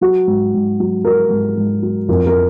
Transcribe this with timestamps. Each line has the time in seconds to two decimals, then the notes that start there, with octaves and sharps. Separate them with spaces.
0.01 F#3 F#4
0.27 G#2
0.54 G#2
0.80 F#3
1.04 F#3 A#4
1.30 G#2
1.57 G#2
1.82 F#3
2.08 F2 A#4
2.26 A#4